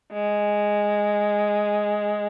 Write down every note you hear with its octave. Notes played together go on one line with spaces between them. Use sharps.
G#3